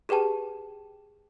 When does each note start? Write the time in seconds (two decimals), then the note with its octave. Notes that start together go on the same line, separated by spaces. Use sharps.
0.09 G4 G#4 B4 G5 A5